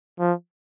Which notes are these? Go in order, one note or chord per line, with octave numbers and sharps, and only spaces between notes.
F3